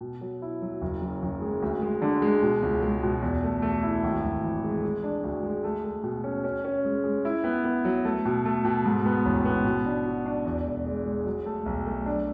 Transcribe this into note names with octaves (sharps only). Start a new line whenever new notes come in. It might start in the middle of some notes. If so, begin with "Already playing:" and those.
B2
F#3
E4
F#3
F#1
F#2
F#1
G#3
D2
G#3
D3
G#3
B2
C#2
G#3
B2
E2
A3
A3
E4
G#1
G#1
E3
G#3
G#3
D4
D2
G#3
A3
A3
B2
C#4
C#4
C#4
G#3
G#3
E4
B3
B3
F#3
A3
B2
A3
B2
G#2
B3
A1
B3
B2
D4
F#4
D4
E2
E1
G#3
G#3
F#3
A3
B1
A3
D4